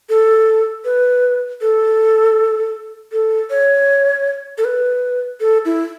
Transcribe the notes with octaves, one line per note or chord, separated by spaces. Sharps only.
A4
B4
A4
A4
C#5
A4
B4
A4
E4